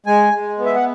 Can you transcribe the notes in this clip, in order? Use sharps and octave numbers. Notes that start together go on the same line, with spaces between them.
G#3 G#5
G#3
B3
E5
F#5